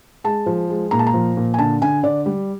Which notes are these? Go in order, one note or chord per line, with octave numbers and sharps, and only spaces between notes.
G#3 A5
F3
G#3
A#2 A#5
A5
A#5
F3
A#2
G#5
D3 A5
D3 G#5
D3 D5
G3